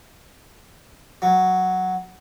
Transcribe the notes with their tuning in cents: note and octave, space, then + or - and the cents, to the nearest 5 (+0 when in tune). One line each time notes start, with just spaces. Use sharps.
F#3 +0